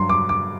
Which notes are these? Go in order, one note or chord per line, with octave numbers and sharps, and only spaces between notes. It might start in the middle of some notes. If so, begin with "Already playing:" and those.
Already playing: G2 F#3 C6
D6
D6